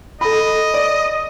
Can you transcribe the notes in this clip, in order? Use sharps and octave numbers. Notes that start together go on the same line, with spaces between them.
A4 D#5 B5
D5